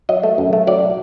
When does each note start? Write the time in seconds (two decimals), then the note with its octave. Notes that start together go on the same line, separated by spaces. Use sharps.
0.09 F#3 D#5
0.23 A3
0.38 F#2
0.53 A3
0.67 F#3 D5